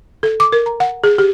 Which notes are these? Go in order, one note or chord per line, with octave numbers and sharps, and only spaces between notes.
A4
D6
A#4
A#5
F#5
G#4
G4